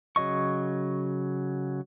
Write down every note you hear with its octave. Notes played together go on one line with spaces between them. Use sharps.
C#3 F#3 D#5 C#6